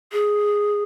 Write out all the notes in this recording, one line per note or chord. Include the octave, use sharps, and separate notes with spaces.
G#4